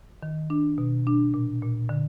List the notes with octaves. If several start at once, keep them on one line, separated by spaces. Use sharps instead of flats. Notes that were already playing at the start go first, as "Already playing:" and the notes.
D#3
D4
B2
D4
A#2
A#2
D3